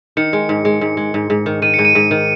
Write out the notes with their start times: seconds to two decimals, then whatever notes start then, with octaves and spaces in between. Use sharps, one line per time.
0.17 D#3 C#7
0.33 G#3
0.49 G#2
0.65 G#3
0.81 G#2
0.97 G#3
1.14 G#2
1.30 G#2
1.46 D#3
1.62 D#3 D#7
1.74 G#2 C#7
1.85 D#7
1.95 G#2
2.11 D#3